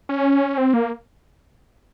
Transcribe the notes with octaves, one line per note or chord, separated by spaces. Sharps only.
C#4
C4
A#3